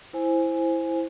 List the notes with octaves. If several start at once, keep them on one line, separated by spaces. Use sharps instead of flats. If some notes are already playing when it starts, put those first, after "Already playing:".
E4 C5 G#5